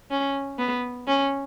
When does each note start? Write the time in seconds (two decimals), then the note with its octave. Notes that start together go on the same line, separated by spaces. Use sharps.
0.11 C#4
0.58 B3
1.07 C#4